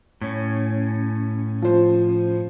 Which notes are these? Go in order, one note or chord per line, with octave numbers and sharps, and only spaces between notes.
A2 C#4
F3 C5